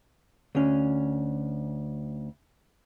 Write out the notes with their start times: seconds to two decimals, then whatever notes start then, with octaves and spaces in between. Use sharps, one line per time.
0.55 D2 C#4